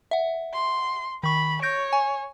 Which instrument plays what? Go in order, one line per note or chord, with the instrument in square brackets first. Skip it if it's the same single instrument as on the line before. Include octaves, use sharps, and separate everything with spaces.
[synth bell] E5 F#5
[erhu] C6
[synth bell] D#3 C#6 [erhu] B5
[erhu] C#5 [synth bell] G6 A#6 D7
[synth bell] G#5